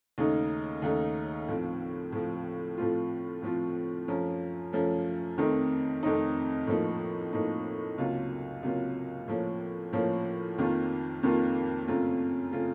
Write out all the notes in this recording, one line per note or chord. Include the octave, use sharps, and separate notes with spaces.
D#2 C#3 A3 D#4
D#2 C#3 A3 D#4
A2 F3 C4
A2 F3 C4
A2 F3 A3 C4 F4
A2 F3 A3 C4 F4
F#2 F3 A3 C#4
F#2 F3 A3 C#4
F2 D#3 A3 C4 D#4
F2 D#3 A3 C4 D#4
A2 F3 A#3 D#4
A2 F3 A#3 D#4
C#2 C3 F#3 A#3 F4
C#2 C3 F#3 A#3 F4
A2 F3 A#3 C#4
A2 F3 A#3 C#4
F2 D#3 A#3 F4
F2 D#3 A#3 F4
F#2 C#3 A3 C4 F4
C#3 A3 C4 F4